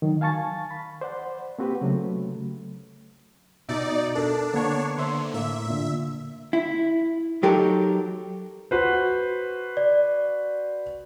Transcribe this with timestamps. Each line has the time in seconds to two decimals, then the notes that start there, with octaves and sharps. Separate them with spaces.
0.02 D#3 F#3
0.21 F5 G#5 A5 C#6 A6
0.71 B5
1.01 C5 D5 F#5
1.59 A#3 C4 F#4 G4 B4 C5
1.81 C#3 F#3 A3
3.69 B2 D#4 D5 E5
4.15 D4 A4 A#4
4.54 D3 A#3 B3 D4 C#5 C#6
4.98 D3 C5 E5 C6
5.34 A2 A#3 E5
5.66 A#2 D3
6.53 E4
7.43 F#3 D#4 G4 A4 A#4
8.71 F#4 B4 C5
9.77 D5